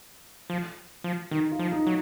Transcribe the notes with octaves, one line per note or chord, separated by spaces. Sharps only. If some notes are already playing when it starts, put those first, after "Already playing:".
F3
F3
D#3 D#4
F4
F3
D#4
F#3